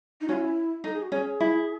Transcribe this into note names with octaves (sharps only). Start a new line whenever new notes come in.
D#4
C#4 E4 F#4
D#4 A4
G#4
F#4
C#4 G#4
E4